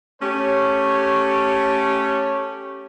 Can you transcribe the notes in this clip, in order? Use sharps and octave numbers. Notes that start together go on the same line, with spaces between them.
A3 C#4 G4 C#5